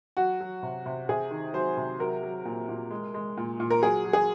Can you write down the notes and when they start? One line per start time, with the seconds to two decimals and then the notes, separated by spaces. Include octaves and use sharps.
0.17 F#3 F#4
0.41 F#3
0.63 C3
0.86 C3
1.09 C3 G#4
1.31 D#3
1.54 F#3 C5
1.77 C3
2.00 F#3 A#4
2.23 F#3
2.45 A#2
2.69 A#2
2.90 G#3
3.14 G#3
3.37 A#2
3.60 A#2
3.70 A#4
3.82 F#3 G#4
4.05 F#3
4.13 G#4